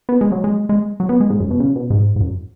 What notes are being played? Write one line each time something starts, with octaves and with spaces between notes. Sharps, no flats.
B3
G#3
F#3
G#3
G#3
F#3
B3
G#3
G#2
F#2
B2
C#3
B2
G#2
G#2
F#2